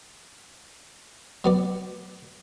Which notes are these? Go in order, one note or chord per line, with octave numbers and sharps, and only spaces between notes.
F#3 B3 D5